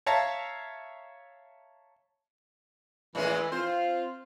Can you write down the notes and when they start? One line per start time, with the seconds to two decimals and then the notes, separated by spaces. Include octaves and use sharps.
0.06 C#5 E5 F5 A5 A#5
3.15 A2 E3 G#3 C#4 E4
3.52 C4 F4 C5